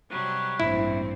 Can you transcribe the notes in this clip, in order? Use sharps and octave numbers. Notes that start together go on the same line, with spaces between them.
C3 F#3 G3
A1 G2 A#2 C4 E4